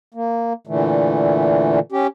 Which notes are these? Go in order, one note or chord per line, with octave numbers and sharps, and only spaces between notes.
A#3
A#2 D3 E3 A3
C#4 G4